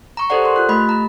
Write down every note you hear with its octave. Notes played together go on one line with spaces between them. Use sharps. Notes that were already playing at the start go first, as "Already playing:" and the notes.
A#5 C#6
G4 A4 C5 D5 F#5
A#4 C6
F4 F#6
A3 G4 D#5 B5
A#5